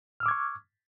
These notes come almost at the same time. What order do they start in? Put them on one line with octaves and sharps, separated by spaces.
F6 E6 D6 G#6 C#6